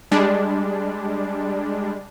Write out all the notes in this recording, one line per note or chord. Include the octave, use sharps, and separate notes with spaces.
G3 G#3 D4